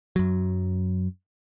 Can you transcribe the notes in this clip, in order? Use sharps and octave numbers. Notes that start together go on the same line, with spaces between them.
F#2 F#3